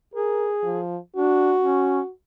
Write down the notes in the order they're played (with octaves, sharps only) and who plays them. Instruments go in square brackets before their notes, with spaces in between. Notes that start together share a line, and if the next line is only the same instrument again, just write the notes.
[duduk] G#4 [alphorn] A#4
[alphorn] F3
[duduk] D4 [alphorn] F#4
[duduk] C#4